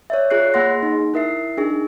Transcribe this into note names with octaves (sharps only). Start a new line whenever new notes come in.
C#5 D5 E5
F4 G#4 C#5 F#6 C7
A#3 G#4 F#5 C6 A#6
D#4
E4 A#4 E5 C7
D4 D#4 G#4